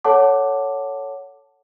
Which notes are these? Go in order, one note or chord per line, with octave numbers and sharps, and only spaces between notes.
A4 C#5 F#5 A5 D6